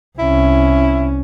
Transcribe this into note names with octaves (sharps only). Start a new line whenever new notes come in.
C2 C#4 E4